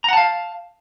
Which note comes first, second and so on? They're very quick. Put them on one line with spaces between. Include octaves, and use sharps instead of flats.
A#5 F#5 A5 F5